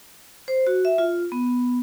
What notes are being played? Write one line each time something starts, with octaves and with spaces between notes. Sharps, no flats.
C5
F#4
E5
F4
B3